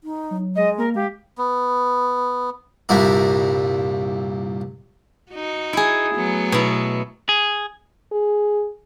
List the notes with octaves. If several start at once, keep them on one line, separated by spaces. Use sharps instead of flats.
D#4
F#3
G#3 D#5
A#3 A#4
G#3 G4 F5
B3
C2 G2 A#2 E4
D#4 F#4
E4 G#4
F#3 A3 B3
B2 E4
G#4
G#4